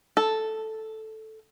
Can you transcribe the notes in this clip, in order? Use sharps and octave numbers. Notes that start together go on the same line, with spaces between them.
A4